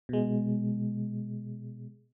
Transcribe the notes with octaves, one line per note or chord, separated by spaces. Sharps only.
B2 G#3